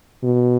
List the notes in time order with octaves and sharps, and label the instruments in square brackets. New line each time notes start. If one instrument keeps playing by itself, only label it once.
[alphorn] B2